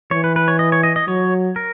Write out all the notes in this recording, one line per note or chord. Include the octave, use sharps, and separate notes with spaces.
E3 C#5
B4
B4
C#5
D#5
C#5
D#5
D#5
F#3 C#5
A#4